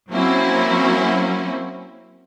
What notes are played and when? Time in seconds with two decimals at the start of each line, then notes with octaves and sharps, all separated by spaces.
0.12 F#3 A#3 C4 C#4 E4 F#4